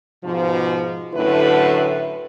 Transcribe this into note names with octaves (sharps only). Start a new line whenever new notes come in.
G#2 B2 F3
F#2 A2 D3 A3 E4 B4